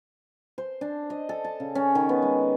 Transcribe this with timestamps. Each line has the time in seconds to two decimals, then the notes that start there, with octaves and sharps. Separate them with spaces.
0.58 C5
0.81 D4
1.10 D#5
1.29 A4
1.44 A5
1.60 C#3
1.75 C#4
1.95 D#3
2.09 B3
2.22 G#3